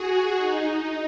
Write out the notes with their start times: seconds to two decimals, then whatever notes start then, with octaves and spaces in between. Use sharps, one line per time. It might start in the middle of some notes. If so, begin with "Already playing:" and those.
Already playing: F#4 G#4
0.37 D#4